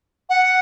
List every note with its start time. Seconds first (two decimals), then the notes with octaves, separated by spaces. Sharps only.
0.29 F#5